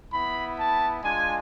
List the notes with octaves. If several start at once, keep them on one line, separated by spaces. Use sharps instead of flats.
B3 E4 B5
A5
G#3 D4 F4 G#5